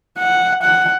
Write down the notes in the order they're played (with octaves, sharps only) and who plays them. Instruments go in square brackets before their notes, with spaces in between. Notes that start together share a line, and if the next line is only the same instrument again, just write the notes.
[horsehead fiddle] F#5
F#5